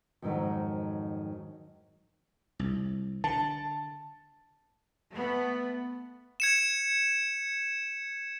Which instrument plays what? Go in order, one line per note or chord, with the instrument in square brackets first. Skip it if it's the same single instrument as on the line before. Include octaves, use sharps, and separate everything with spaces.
[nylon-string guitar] F2 G#2 D#3 F#3
[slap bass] C2
[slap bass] D3 [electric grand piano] A5
[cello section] A3 B3
[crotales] G#6 C#7 E7